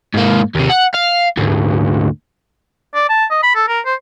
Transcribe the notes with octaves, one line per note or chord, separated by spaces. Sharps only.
G#2 A#3
D#2 C3
F#5
F5
D2 G#2
D5
A5
D#5
B5
A4
A#4
C5